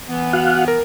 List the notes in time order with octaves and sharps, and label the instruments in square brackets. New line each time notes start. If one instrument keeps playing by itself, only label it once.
[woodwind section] E3 B3
[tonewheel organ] F#4 F5 F#5
[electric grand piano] A#4